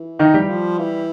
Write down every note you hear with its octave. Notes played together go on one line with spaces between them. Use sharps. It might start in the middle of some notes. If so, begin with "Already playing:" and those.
Already playing: E3
D#3 D#4
G3 G4
F3
E3